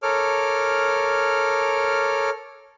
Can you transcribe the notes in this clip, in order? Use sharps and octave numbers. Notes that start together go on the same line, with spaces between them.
A4 A#4 C#5 D6 F6